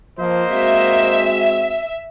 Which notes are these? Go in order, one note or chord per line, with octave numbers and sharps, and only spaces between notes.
F3 A#3 C5 D#5
G#3 C4 F#4 E5